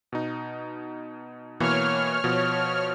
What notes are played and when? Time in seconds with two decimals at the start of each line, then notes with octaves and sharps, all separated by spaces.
0.12 B2 D#4
1.60 B2 E3 A#3 C#5 F6
2.24 B2 F3